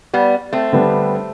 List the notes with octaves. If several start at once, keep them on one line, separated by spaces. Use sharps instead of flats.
G3 B3
A3 C4
D3 G3 B3 D4